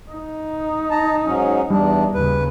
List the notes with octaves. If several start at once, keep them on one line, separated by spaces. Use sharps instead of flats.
D#4
A5 A#5
G#2 F#3 C#4
E2 G3 D4
D#2 C#3 B4